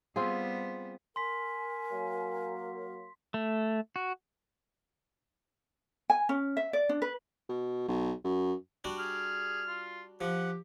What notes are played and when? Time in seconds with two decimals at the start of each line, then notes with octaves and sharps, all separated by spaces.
0.16 G3 B3 C4 F4 G#4
1.16 A#4 G#5 C6 B6
1.91 F#3 A#3
3.34 A3
3.96 F#4
6.10 G#5
6.29 C#4
6.57 E5
6.73 D5
6.89 D4
7.02 B4
7.49 B2
7.88 B1
8.24 F#2
8.84 G3 D4 F#4
8.99 G#4 F6
9.68 F4
10.21 F3 G4 F#5